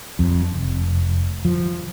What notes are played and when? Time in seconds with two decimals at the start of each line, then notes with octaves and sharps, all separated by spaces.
0.19 F2
0.54 F1
1.45 F3